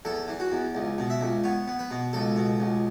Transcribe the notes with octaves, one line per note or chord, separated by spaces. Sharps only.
E2 A4
E3
F#4
E2
C#2
B2
E5
C#2
B3 C#5
B3
B4
B2
C#2 A4
B2
C#2